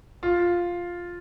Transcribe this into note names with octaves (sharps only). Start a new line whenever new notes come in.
F4